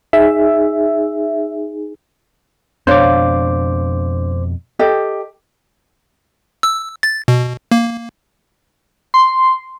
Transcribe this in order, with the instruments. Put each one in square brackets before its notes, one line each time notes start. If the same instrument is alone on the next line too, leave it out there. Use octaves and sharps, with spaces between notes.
[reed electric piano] D#4 G#4 [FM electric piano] E5
[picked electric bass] F2 B2 [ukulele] D4 C#5 F5 [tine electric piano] C5 D6
[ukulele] G4 A4 D#5
[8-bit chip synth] E6
A6
B2
A#3
[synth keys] C6